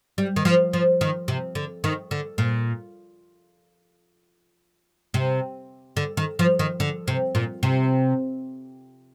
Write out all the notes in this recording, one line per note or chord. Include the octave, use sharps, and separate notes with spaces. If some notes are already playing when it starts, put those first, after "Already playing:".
G3
D#3
F3
F3
D#3
C3
D3
D#3
D3
A#2
C3
D3
D#3
F3
D#3
D3
C3
A#2
C3